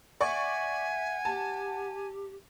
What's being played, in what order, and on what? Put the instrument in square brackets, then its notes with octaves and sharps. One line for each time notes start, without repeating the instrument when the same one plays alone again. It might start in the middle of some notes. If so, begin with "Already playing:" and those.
[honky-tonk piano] D5 C#6 [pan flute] E5 [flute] F#5 [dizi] G#5
[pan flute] G4 [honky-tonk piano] A5